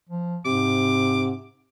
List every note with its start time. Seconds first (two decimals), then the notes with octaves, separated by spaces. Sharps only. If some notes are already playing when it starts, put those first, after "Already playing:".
0.09 F3
0.45 G#2 C3 D6